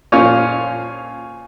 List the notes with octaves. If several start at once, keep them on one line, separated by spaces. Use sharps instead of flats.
A#2 C#4 F4
F3